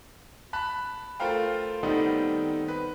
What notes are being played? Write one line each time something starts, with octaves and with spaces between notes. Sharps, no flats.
A5 B5 F#6
A3 F4 A#4 C5 F5 G5
D#3 G3 A3 B3 C4 D#4
B4